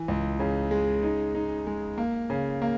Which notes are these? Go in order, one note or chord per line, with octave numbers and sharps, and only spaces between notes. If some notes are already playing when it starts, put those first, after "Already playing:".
Already playing: E3
C#2
C#3
G#3
D#4
D#4
G#3
A#3
C#3
A#3